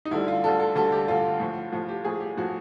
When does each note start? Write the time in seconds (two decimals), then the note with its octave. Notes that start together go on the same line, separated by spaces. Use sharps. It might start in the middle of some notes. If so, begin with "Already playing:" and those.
0.05 D#4
0.11 D2 D3 G3 E4
0.28 F4
0.44 D2 D3 G3 A4
0.60 A4
0.75 D2 D3 G3 A4
0.92 G4
1.08 D2 D3 G3 F4
1.40 A2 F3
1.72 A2 F3
1.89 G4
2.05 A2 F3 G#4
2.20 G4
2.37 A2 F3 F#4